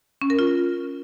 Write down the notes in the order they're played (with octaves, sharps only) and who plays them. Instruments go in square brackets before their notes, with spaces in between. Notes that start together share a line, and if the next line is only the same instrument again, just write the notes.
[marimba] C#4
A#4
F4